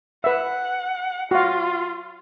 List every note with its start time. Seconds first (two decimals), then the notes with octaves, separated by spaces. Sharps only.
0.24 B4 E5 F#5
1.31 F4 F#4 F5